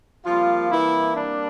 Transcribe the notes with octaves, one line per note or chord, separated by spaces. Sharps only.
C3 F3 G3 A#3 F4
E3 E4
D4